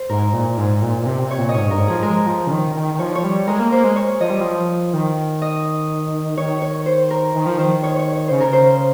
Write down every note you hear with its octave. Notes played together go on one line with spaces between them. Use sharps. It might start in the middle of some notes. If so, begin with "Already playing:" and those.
Already playing: C5
G#2 A#4
A#2
G#2
A#2
A#2
C3
C3
C#5
A#2
D#5
G#2 C#5
G2 A#4
G#2
F3 G#4
G#3 A#4
F3
C#3
D#3
D#3
D#3
F3 C#5
C#5
G3
G#3 A#4
A#3
A#3 C5
G#3
C#5
F3 D#5
G3
F3
D#3
D#5
D#3 C#5
C#5
C5
A#4
D#3
F3
D#3 C5
C#5
C#5
C#5
C#3 C5
A#4
C5